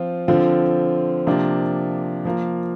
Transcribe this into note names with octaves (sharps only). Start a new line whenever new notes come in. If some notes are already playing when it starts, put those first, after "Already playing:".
Already playing: F3 C4 F4
D3 F3 C4 F4
C3 F3 A#3 D4
F3 A#3 F4